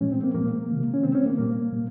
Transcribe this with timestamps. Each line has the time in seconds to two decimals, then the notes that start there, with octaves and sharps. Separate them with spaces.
0.01 A#2 F3 G#3 C#4
0.12 C4
0.23 A#3
0.34 A#2 F3 G#3 A#3
0.70 C3 D#3 G#3
0.94 C#4
1.03 C3 D#3 G#3 C4
1.15 C#4
1.26 A#3
1.38 A#2 G3 A#3
1.72 A#2 G3